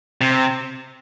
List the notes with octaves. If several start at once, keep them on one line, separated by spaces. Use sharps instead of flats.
C3